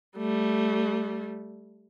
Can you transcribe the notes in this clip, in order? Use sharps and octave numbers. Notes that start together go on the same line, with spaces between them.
G3 A3